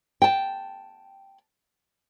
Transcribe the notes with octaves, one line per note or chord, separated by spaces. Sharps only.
G5 A5